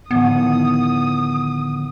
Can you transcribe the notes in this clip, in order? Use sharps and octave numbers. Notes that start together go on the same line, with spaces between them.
A2 D3 D#3 F3 B3 D#6